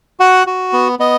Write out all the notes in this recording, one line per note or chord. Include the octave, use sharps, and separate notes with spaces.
F#4 F#5
F#4
B3
B3 D#5